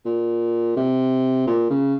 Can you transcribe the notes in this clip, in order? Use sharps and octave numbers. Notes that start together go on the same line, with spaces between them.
A#2
C3
A#2
C#3